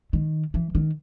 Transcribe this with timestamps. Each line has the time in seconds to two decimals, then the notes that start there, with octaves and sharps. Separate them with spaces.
0.13 D#3
0.54 E3
0.75 D#3